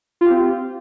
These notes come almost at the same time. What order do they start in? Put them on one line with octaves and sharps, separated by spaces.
F4 G4 C4